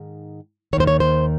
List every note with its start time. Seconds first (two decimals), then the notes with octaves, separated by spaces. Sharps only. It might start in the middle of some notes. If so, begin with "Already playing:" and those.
Already playing: G#2 D#3
0.73 D#3 C#5
0.77 D#2 C5
0.87 C#5
1.00 C5